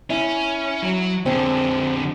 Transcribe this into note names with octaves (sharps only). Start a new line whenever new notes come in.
C#4 E4
F#3
F2 D3 C4 G#4